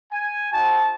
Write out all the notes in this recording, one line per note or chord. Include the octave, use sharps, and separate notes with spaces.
G#5
C4 D#4 F#4 A5